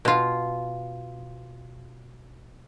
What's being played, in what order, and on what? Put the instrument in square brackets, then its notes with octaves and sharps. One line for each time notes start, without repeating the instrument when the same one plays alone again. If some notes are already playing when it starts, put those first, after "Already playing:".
[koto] B2 F4